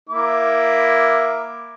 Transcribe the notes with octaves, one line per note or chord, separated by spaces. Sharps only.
A#3 E4 D6